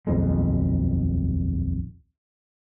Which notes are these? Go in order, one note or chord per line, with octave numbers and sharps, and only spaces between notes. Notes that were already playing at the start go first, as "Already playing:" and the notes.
D#1 B1 F2 G#3